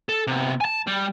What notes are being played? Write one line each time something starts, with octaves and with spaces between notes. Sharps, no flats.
A4
C3 B3
G#5 A5
G3